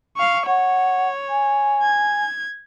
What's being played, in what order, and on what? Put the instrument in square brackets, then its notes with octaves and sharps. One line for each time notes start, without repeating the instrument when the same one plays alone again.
[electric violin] F5 C#6
[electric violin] C#5 [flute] F#5
[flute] G#5
[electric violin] G#6